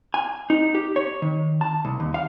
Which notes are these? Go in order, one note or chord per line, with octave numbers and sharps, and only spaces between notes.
G#5
D#4
G4
C#5
D#3
A5
C2
D#2
F5